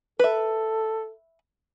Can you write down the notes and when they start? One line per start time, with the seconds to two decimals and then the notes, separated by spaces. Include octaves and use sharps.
0.19 A4 B4 E5